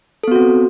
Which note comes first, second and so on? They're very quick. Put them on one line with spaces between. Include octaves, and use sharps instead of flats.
A4 B3 F#4 C4